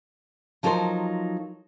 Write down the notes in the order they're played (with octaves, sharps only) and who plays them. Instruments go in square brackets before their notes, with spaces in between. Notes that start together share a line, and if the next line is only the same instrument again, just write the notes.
[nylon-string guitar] F3 F#3 D#4 A4 A#4 C5